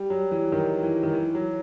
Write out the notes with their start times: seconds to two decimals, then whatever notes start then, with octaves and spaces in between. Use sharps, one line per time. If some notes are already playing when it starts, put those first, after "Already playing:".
Already playing: G3
0.10 F#3
0.31 E3
0.52 D#3
0.83 E3
1.03 D#3
1.13 E3
1.35 F#3